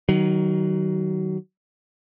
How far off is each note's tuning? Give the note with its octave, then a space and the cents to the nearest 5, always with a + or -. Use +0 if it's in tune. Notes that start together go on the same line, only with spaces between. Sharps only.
D#3 +0 F#3 +25